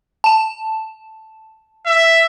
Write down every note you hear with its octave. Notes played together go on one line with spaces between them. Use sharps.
A5 E7
E5